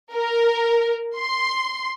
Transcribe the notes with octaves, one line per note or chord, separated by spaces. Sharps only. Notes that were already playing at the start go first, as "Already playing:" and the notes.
A#4
C6